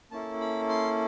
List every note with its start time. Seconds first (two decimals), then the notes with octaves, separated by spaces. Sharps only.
0.11 A#3 C#4 E4 A4 A5
0.41 B5
0.69 C6